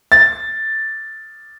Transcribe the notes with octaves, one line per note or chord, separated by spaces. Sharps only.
A6